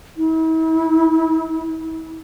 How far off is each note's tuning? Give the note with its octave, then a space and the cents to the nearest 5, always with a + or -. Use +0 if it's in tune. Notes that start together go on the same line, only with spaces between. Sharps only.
E4 -40